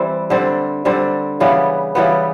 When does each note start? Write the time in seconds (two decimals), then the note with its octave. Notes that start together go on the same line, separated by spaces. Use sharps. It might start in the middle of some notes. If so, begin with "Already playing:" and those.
Already playing: E3 G3 C4 E4
0.30 D3 G3 C4
0.85 D3 G3 C4
1.40 C#3 E3 G3 B3
1.95 C#3 E3 G3 B3